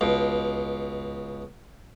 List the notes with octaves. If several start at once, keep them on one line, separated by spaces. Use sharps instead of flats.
C#2 B2